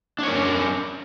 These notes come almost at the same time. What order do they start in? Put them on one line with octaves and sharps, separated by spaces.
D4 C#5 A#4 C#4